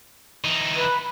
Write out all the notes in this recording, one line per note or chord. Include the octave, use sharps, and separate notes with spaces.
E3 D#4
B4